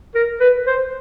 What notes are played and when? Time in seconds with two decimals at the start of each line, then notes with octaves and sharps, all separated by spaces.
0.15 A#4
0.40 B4
0.67 C5